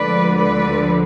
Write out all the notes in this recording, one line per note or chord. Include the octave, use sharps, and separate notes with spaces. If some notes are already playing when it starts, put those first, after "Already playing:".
Already playing: D2 D3 F3 G#3 B4 D5
B4 D5